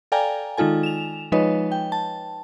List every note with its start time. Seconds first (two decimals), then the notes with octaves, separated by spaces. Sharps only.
0.12 A4 D5 F5 G5 G#5 A#5
0.57 D#3 G#3 D#4 F4 A4 G#5
0.83 E7 F7
1.32 F3 G#3 D#4 B4 C#5 D#5
1.72 G5
1.92 A5